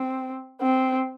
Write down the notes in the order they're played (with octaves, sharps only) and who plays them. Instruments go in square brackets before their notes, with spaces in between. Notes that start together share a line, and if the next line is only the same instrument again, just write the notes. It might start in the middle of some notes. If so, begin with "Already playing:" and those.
Already playing: [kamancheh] C4
C4